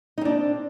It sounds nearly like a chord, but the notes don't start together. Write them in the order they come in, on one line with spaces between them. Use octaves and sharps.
D#4 C4 D4